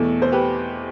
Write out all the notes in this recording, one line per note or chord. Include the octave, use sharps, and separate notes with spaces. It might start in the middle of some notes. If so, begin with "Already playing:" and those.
Already playing: E2 B2 A3 A4
C5
G4 B4